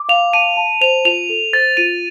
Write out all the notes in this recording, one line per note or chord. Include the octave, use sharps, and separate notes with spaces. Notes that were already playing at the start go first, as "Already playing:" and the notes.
Already playing: D6
F5 F7
A5 D#7
A5
C5 F7
F4 F7
A4
C5 A6
F4 D#7